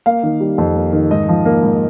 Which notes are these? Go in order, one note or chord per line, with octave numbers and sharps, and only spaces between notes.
A#3 F5
D#3
G3
F2
A#3
D#3
G#2 D#5
F3
A#3
G#2